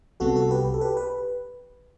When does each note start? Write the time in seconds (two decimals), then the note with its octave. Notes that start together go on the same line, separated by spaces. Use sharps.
0.20 C2 C3 G3 B3 F#4 A4
0.36 F#4 A4
0.51 G4 B4
0.74 A4
0.81 G4 B4
0.97 B4